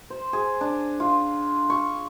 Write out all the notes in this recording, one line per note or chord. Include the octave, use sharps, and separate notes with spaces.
C5
G#4
D4
F4
C#6